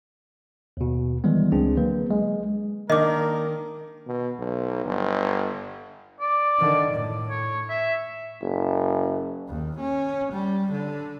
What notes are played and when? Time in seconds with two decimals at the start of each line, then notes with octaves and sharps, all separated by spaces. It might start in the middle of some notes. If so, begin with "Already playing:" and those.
0.77 D#2 B2
1.24 D#3 E3 G3 G#3 B3
1.52 C#2 C4 D4 G#4
1.77 D3 F#3 A#3 B4
2.10 G#3
2.90 D#3 A#3 D4 A#4 D#5 D6
4.07 B2
4.39 B1
4.85 G1
6.20 D5
6.59 D3 D#3
6.92 A2
7.30 C#5
7.70 E5
8.42 F#1
9.49 D#2
9.79 C#4
10.32 G3
10.72 D3